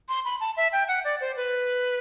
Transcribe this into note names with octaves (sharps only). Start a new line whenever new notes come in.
C6
B5
A5
E5
G5
F#5
D5
C5
B4